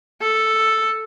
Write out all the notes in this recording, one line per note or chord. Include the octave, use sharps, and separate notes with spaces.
A4